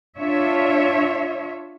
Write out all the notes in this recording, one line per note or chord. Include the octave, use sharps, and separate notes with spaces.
D4 F4 C#5 E5